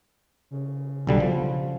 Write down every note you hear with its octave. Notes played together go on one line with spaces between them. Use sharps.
C#3
B1 D3 G3
F3